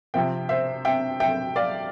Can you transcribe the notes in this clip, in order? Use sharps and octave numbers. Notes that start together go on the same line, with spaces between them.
C3 F3 C4 E5 G5
C5 E5
E5 G5
E5 G5
D5 F5